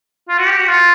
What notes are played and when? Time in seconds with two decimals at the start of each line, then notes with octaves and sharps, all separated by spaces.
0.29 F4
0.38 F#4
0.48 G4
0.58 F#4
0.68 F4